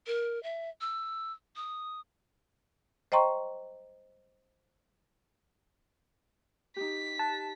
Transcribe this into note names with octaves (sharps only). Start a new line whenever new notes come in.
A#4
E5
E6
D#6
C5 D#5 G5 A#5 C6 C#6
D#4 G4 B6
A5 F#6